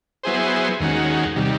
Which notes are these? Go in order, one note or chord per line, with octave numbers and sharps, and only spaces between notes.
F#3 B3 E4 G#4 C5
D#2 D#3 G#3 C#4 F#4
C3 D#3 G3